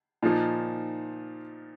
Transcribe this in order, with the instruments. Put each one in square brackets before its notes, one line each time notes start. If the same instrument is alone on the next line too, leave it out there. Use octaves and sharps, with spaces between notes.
[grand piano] A#2 F3 D#4